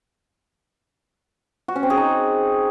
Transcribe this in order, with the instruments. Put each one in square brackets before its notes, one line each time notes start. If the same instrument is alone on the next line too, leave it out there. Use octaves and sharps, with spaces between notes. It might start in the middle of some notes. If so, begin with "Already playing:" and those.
[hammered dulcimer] F#4
C#4
C4
G#4
D#4